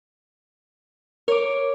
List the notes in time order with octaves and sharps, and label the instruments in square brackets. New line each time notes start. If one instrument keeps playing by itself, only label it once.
[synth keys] A#4 [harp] C#5 D6